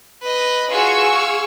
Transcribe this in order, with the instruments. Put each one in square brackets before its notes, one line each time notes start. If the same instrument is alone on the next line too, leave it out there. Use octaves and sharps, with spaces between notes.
[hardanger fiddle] B4 D#5
[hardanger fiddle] F4 F#4 [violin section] G#4 C#6 E6
[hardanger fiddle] F5